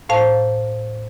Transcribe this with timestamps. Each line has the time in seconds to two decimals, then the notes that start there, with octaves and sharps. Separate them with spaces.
0.09 A2 C5 F5 A5